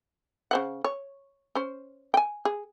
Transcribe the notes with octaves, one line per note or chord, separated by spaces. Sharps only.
C#3 C5 F#5
C#5
C#4 C5
G5 G#5
G#4